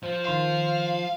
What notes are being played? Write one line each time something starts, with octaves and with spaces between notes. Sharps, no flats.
F3
D#3 F5 C6 C7